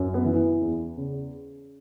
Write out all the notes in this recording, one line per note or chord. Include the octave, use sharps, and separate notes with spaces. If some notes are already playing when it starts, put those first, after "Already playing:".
Already playing: F#2
B3
E3
E2
C#3